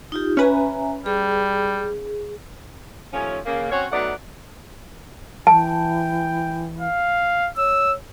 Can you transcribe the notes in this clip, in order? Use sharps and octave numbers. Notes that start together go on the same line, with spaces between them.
D#4 F4 G4
C#4 B4 E5 G#5 A#5
G3 G#4
D#2 F3 A3 C#4
C#3 A#3
C4 C#4 F#4 C#5
F#3 A3 B3 D#4 D5 F#5
E3 G5 A5
F5
C#5 E6